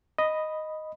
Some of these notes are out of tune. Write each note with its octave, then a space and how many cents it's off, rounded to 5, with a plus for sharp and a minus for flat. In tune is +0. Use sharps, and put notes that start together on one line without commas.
D#5 +0 B5 +0